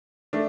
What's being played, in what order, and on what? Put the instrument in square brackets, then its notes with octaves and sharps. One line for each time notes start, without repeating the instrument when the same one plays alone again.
[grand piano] A3 D4